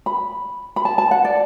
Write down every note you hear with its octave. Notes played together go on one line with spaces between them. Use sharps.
B5
B5
A5
A5
F#5
D5